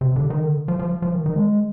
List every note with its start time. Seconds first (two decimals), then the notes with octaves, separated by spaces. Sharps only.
0.01 C3
0.16 D3
0.30 D#3
0.45 D3
0.68 F3
0.79 F3
1.02 F3
1.14 D#3
1.26 D#3
1.36 G#3